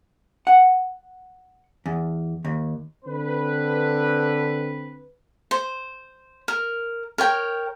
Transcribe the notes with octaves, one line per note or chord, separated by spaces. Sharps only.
F#5
E2
D#2
D3 C4 B4
C5
A#4
A#4 C#5 G5